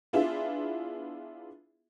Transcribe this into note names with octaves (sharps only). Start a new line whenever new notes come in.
B3 D4 E4 F4 G#4 E5